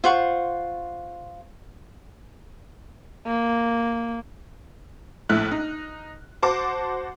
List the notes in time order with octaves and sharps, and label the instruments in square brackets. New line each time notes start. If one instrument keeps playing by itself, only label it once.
[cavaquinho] F4 C5 F#5 C#6
[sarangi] A#3
[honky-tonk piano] A#1 A2 E4 F6 F#6
D#4
F#4 C5 A5 D6